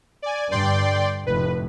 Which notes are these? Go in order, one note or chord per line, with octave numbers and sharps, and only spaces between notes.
D5 G#5
G2 D3 D5 G5 C6
F1 A2 B4